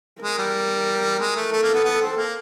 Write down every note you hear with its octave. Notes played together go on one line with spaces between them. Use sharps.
G#3 A#4
G3
G#3
A3
A3 A4
A#3
B3
B3
C4
A#3